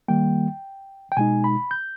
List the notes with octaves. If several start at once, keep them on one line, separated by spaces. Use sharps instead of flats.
D#3 G3 A#3 G5
G5
B2 G#3 D#4 G#5
B5
G6